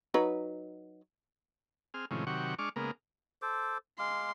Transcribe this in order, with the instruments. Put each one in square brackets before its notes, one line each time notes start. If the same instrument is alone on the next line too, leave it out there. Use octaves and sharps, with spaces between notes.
[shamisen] F#3 D#4 B4
[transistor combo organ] C4 G#4 F6
A2 C3 D#3 F3 G#3 C#4
C3 D#3 F#3 G4 F#5 C#6
G#3 D4 C#6 D6 F6
C#3 G#3 A#3 B3 A#4
[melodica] A4 C5 D6
[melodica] G#3 F5 D6 [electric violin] C6